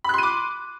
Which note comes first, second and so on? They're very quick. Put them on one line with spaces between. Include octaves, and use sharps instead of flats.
B5 F#6 C6 D#7 D6